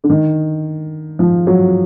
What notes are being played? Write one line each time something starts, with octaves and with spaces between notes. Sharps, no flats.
D3
D#3
F3
F#3